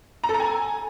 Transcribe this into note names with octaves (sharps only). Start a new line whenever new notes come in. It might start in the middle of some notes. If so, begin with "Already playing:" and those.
A#5
A4
A#5
G#5